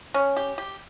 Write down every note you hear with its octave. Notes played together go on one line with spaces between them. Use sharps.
C#4
G4
G4